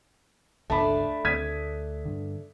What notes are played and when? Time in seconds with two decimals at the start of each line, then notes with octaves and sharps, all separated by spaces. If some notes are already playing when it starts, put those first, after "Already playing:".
0.70 G1 C#2 A3 D4 A5 B5
1.25 D2 G#6 B6 D#7
2.05 G2 D3